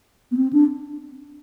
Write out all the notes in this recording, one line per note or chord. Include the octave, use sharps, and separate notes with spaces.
B3
C4
D4